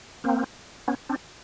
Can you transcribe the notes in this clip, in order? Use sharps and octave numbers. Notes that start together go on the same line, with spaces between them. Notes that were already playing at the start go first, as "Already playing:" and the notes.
A#3 C4
B3 C#4
C4 D4